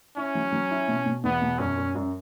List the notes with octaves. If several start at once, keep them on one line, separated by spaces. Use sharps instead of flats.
C#4 E4
F#3
F#3
E4
B2
B2
E2 B3
B2
F#2 C#4
F#2
F#2